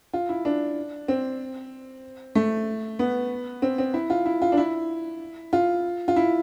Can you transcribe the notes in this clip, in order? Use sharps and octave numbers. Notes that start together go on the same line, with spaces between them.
F4
E4
D4
C4
A3
B3
C4
C4
E4
F4
E4
F4
D4
E4
F4
F4
E4